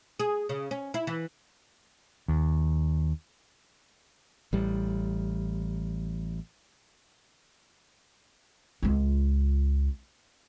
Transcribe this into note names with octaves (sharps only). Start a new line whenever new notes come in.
G#4
C#3
C#4
E4
E3
D#2
A1 G3
C#2 F4